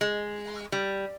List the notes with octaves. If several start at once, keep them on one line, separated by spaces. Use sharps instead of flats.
G#3
G3